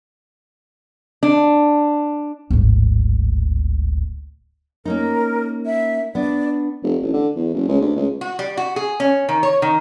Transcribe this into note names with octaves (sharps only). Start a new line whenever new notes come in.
D4
D1 G#1
A#3 C#4 D#4 A#4
E5
B3 D4 D5
F1
A1
D3
E2
F#1
C#2
D2
C#2
F#4
G3
F#4
G#4
C#4
D#3
C#5
D#3